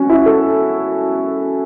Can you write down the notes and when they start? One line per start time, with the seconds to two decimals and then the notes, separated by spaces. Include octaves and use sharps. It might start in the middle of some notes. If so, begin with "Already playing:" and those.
Already playing: C#4 F#4
0.10 E4
0.26 A4